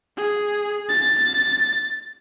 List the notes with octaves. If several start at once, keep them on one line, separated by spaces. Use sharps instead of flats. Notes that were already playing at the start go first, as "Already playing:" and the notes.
G#4
A6